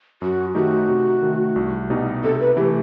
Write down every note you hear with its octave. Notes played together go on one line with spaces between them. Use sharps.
F#2 F#4
D#3 A3 D#4 F#4 G4
C3
D#3 A3
C2
B2 G3 D#4
C3 A4
B4
E3 A3 G4